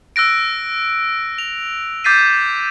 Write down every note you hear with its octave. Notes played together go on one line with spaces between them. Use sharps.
E6 F#6 A#6 D7
F7
D6 G6 A6 B6 C7 D#7